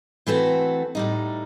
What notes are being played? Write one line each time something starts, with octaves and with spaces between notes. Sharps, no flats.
E3 A3 C4 F#4 A4
A2 G3 D#4